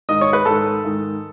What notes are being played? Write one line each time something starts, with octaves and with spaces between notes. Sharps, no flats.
G#2 D#3 D#5 D#6
C#5 C#6
B4 B5
G#2 D#3 A4 A5
G#2 D#3